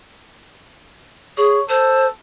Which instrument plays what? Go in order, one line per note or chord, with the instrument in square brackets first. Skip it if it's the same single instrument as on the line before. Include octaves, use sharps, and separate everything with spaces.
[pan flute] G#4 [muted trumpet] C#5
[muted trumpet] A4 [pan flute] C5